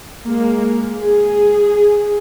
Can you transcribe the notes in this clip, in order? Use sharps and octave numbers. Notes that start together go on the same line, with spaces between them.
G#3 A#3
G#4